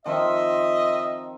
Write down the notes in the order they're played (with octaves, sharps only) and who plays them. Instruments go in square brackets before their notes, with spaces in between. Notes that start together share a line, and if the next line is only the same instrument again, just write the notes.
[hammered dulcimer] D#3 F3 C4 [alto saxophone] D#5 [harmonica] E5